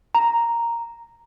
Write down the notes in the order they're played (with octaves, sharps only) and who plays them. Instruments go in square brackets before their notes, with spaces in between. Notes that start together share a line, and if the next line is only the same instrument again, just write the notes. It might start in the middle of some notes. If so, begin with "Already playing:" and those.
[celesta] A#5